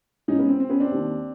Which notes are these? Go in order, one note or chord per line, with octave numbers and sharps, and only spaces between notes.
G#2 E3 C#4 D#4
B3 C#4
C4
C4
B3 C#4
C4 D4
D#2 D#3